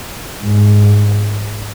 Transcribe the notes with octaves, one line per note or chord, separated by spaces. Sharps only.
G#2